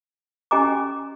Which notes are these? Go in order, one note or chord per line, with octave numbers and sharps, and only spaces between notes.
C#4 G4 D#5 G#5 A#5 D6